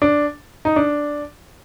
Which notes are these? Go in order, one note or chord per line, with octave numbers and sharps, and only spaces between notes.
D4
D#4
D4